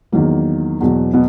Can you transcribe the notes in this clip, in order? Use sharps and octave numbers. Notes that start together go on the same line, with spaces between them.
E2 D#3 F#3 A#3
E2 B2 F#3
B2 B3